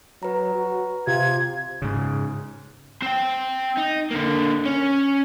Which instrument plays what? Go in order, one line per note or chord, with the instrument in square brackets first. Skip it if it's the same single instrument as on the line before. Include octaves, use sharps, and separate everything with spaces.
[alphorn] F#3 [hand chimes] B4 A#5
[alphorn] F#4
[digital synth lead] C3 [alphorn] F4 [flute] G#6
[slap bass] G#2 C#3
[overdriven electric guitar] C4 G5
D#4
D3 A#3
C#4